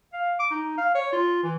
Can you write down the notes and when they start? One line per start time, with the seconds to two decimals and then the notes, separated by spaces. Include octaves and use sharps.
0.13 F5
0.39 D6
0.51 D#4
0.78 F5
0.95 C#5
1.13 F4
1.43 E3